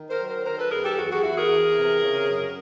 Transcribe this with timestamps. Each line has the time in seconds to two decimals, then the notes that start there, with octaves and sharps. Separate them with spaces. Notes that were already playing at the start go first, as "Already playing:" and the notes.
Already playing: D#3
0.10 A#4 C5
0.19 F#3
0.28 A#4 C5
0.45 D#3 A#4 C5
0.58 A4 B4
0.71 F#2 G#4 A#4
0.84 G4 A4
0.97 E2 F#4 G#4
1.10 F#4 G#4
1.23 E2 E4 F#4
1.36 G#4 A#4
1.50 E3
1.76 C3
2.02 C#3
2.28 F#2